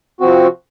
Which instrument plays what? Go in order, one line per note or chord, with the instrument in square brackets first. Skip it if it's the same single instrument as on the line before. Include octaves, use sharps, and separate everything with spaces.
[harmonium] C3 F3 C4 F#4